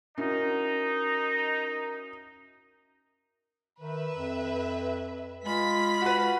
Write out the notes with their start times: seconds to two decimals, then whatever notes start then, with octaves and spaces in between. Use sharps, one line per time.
0.18 C#4 D#4 E4 F#4 A#4
3.80 D#3 B4 E5
4.15 F2
5.45 G#3 F4 B5 B6
6.02 F#4 B4